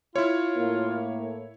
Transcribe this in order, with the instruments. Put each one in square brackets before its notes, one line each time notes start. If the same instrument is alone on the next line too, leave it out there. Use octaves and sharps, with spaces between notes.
[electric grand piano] E4 C#5 [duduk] F4
[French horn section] A2 A#3